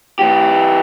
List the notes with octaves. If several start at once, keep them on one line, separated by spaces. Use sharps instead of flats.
E3 G4